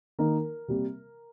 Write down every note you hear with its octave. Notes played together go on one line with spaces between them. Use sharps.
D#3 A#3 D#4 A#4
C3 G3 A#3